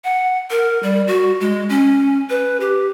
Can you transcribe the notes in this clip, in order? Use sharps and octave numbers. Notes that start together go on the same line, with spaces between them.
F#5
A#4
G3
F#4
G#3
C#4
B4
G4